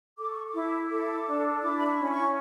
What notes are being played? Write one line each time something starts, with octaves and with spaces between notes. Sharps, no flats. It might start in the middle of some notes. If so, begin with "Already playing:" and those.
A4 D6
C#6
D6
E4
A4 D6
D4
E4 D6
B5
C#6
C#4
B5
C#6